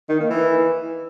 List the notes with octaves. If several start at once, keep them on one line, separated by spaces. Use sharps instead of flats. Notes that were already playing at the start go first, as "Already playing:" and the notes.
D#3
A#3
E3